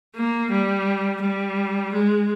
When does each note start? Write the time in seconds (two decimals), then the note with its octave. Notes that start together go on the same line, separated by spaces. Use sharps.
0.15 A#3
0.51 G3
1.22 G3
1.93 G#3